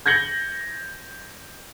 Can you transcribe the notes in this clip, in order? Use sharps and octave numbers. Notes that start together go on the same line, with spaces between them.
G6 G#6 A#6 C#7 F#7 G7